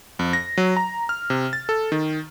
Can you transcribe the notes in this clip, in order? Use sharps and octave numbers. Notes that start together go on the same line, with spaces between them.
F2
A#6
F#3
A#5
F6
C3
A6
A4
D#3